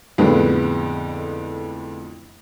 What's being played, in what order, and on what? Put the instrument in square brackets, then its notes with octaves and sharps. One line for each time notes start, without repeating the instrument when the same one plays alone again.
[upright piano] F2 A2 D3 G#3 B3